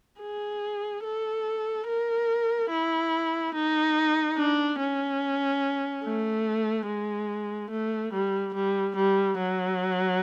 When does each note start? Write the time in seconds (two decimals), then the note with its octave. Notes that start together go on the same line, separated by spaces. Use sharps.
0.21 G#4
1.04 A4
1.88 A#4
2.70 E4
3.55 D#4
4.37 D4
4.80 C#4
6.04 A3
6.87 G#3
7.70 A3
8.13 G3
8.54 G3
8.96 G3
9.38 F#3